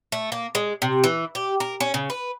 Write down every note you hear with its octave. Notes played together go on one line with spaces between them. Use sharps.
A3
A#3
G#3
C3
E3
G4
A#4
C#4
C#3
B4